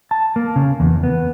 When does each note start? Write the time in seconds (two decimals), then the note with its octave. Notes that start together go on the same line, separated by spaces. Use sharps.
0.11 A5
0.36 A#3
0.56 C#3
0.80 E2
1.03 B3